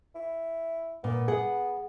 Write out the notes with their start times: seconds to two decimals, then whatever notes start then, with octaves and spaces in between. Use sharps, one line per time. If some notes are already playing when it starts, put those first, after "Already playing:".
0.15 E4
1.04 A#2 B3
1.28 G#4 F#5